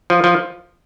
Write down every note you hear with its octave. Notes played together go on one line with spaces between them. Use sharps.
F3
F3